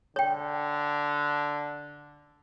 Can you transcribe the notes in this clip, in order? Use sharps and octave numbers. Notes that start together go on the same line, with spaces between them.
D3 C#5 G5